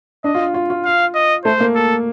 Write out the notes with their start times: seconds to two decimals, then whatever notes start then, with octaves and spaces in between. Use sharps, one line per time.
0.24 D4 D#5
0.35 F4
0.54 F4
0.70 F4
0.85 F5
1.15 D#5
1.45 A3 C5
1.60 A#3
1.75 A4